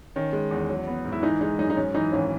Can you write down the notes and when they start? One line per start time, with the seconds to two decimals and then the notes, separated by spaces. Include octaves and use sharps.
0.16 D#3 C#4
0.33 G#3
0.51 E2
0.69 F#3
0.87 B3
1.05 G#2
1.12 E4
1.23 E3 D#4
1.41 G#3 D#4
1.59 F#2 D#4
1.70 D#4
1.77 G#2 C#4
1.94 E3 D#4
2.12 G#1 C#4